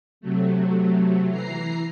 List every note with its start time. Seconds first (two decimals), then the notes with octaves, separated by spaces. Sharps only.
0.21 C3 F#3 A3
1.29 E3 A#5 C7